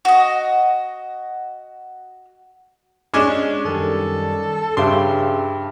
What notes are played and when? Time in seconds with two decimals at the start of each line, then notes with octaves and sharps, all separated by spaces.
0.05 F#4 D#5
3.14 G#3 C#4 D4 D6 E7
3.65 F#2 D#3 G3 A4
4.77 G2 C#3 E5 G5 A5 C6 D6